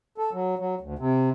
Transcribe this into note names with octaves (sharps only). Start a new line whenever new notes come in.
A4
F#3
F#3
D2
C3